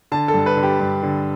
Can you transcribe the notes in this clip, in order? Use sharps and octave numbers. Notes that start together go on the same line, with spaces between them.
D3 A5
A4
G2
B4
D3
G4
G2
D3